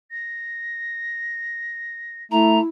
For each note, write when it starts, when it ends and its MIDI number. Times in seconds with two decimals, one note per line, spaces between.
0.11 2.24 94
2.32 2.59 57
2.32 2.66 64
2.32 2.60 82